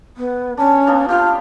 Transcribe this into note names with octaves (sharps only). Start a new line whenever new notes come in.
B3
C#4 D4
A#3 B3 D4
F4 G4 G5